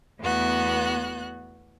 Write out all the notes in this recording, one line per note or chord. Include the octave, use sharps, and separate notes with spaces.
E2 A3 B3 F#4 F#6